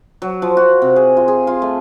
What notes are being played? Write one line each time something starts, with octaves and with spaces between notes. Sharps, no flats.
F#3
F3
F#4
C3
G#4
F4
G#4
F4
A3